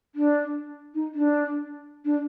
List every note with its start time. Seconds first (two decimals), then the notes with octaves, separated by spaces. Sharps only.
0.15 D4
0.94 D#4
1.14 D4
2.05 D4